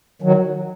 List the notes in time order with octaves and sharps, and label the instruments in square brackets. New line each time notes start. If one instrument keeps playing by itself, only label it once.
[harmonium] D#3 F#3